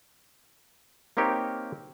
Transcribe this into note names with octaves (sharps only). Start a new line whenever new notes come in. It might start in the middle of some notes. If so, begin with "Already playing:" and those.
A#3 C4 D#4 G4 A#4 C#5